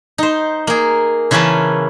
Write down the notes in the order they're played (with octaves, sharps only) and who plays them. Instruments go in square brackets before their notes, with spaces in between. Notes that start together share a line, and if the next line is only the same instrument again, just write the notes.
[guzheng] D#4 C5
A#3 G#4
C#3 E3 A#3 C#4 B4 A5